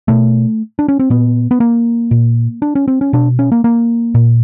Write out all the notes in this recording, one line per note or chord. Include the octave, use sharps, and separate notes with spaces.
B2 A3
D4
C#4
C4
A#2 B3
B3
A#3
A#2
D4
C#4
C4
C#4
B2 D4
C#4
A#3
A#3
A#2